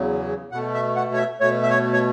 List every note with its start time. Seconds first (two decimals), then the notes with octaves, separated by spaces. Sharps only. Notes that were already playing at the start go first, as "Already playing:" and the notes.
Already playing: E2 C#3 F#3
0.52 B2 A3 F#5
0.74 E5
0.96 F#5
1.13 C#5
1.18 E5
1.40 B2 A3 C#5
1.62 E5
1.70 C#5
1.93 C#5